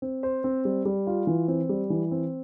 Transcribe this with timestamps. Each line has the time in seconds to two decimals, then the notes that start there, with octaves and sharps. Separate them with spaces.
0.02 C4
0.23 C5
0.44 C4
0.65 G3
0.85 G3
1.07 F4
1.27 E3
1.48 C4
1.69 G3
1.90 E3
2.11 C4